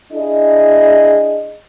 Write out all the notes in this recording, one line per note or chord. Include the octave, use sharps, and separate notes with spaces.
D4 E4 G#4 D#5